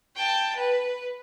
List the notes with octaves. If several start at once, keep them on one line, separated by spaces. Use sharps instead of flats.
G5 A5
B4